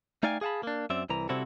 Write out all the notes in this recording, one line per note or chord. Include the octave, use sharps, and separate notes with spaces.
A3 D#4 D5 F5 G5 G#5
G#4 F5 F#5 A5 B5
A#3 D4
F#2 C4 D5 E5
C2 E3 A#5
C3 G3 C4 E4 F#4 A4